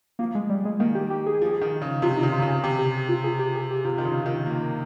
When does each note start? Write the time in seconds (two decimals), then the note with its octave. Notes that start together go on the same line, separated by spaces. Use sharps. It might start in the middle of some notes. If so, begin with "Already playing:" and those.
0.19 F3 A#3
0.35 G#3
0.49 G3
0.65 G#3
0.80 D#3 A#3
0.95 G4
1.10 G4
1.26 G#4
1.42 F3
1.61 D#3
1.82 C#3
2.02 C3 F4
2.17 D#4
2.23 C#3
2.32 F4
2.39 C3
2.42 C#3
2.48 G#4
2.63 C3 G4
2.79 G4
3.09 F4
3.24 G#4
3.39 G4
3.55 G#4
3.70 G4
3.85 C3 F4
3.98 D#3
4.05 C#3
4.26 D#3
4.46 A#3